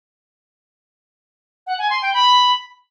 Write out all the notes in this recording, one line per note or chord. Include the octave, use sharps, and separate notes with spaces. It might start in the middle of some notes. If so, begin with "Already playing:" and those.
F#5
G#5
C6
G5
B5